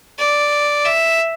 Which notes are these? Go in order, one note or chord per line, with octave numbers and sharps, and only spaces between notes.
D5
E5